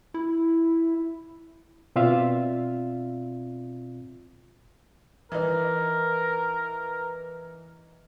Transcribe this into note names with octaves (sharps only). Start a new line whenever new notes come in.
E4
B2 C4 F4 D5 E5 F5
E3 D#4 A#4